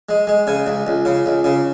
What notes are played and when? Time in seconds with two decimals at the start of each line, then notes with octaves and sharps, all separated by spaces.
0.09 G#3
0.27 G#3
0.47 C#3 G#5
0.67 C#2
0.87 C#2
1.05 C#3
1.26 C#2
1.44 C#3